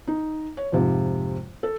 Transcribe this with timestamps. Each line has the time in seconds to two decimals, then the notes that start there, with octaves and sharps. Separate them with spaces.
0.07 D#4
0.57 C#5
0.72 F2 G#2 C3 F3
1.63 A4